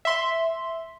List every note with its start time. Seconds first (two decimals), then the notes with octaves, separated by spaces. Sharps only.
0.05 E5 C6